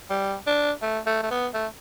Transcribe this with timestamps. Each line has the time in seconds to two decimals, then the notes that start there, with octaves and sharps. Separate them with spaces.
0.10 G3
0.46 D4
0.82 A3
1.06 A3
1.23 A3
1.31 B3
1.54 A3